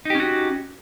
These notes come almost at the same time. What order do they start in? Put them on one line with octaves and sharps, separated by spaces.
D#4 G4 C#4 F#4